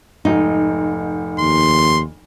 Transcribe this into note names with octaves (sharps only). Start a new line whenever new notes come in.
F1 G#2 D#4
D#2 C6